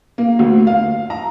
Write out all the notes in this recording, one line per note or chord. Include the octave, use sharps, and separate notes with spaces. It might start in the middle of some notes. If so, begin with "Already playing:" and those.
A#3
D2
F5
A#5